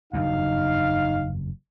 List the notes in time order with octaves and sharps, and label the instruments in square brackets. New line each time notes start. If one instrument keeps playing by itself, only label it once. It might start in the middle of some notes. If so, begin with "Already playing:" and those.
[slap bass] F#1 E2 G2 [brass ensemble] D#4 F5